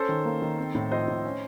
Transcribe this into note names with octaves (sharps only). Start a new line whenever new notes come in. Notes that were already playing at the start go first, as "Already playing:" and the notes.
Already playing: C#4 A4 C5
D#3
A#3
D#3
C4
A2
F3 C5 D#5
A2
C#4